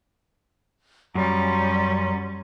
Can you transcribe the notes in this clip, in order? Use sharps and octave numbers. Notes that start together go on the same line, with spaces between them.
F#2 G3 C#4 C#5 A#5 C6